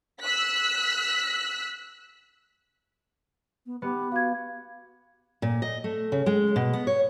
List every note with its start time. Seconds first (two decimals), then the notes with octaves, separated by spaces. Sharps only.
0.21 E6 F#6 B6
3.66 B3
3.82 B3 G4
4.12 F#4 F5 G#6
5.42 A#2
5.62 D#5
5.84 A3
6.12 C#3
6.26 G#3
6.56 B2
6.73 B3
6.87 C#5